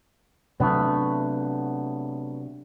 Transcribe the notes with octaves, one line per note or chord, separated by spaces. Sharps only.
C3 F#3 A3 B3 D4